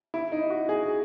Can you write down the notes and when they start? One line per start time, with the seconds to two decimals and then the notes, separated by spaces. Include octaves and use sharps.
0.14 E4
0.32 D#4
0.50 F#4
0.69 G#4